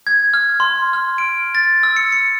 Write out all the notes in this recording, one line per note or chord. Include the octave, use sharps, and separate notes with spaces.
G#6
F6
C6
F6
D7
A6
E6
C#7
C#7